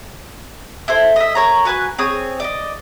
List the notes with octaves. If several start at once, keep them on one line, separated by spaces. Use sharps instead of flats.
E4 A4 C5
D#5 E5
A#4 C#5 A#5
F#4 B4 G#5 F#6
C4 G#4 C#5 D#6
D5 D#5